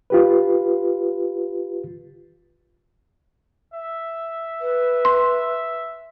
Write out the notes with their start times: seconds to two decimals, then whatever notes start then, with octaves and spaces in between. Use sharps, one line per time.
0.10 F4 G4 B4
3.74 E5
4.61 B4
5.05 C6